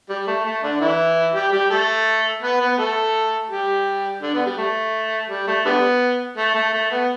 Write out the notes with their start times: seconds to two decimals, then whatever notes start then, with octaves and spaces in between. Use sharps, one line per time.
0.09 G3
0.27 A3
0.45 A3
0.63 D3 D4
0.81 E3 E4
1.34 G3 G4
1.52 G3 G4
1.70 A3 A4
2.42 B3 B4
2.60 B3 B4
2.78 A3 A4
3.50 G3 G4
4.22 D3 D4
4.34 B3
4.46 G3
4.58 A3
5.29 G3
5.47 A3
5.65 D3 G3 B3
6.37 A3
6.55 A3
6.73 A3
6.91 B3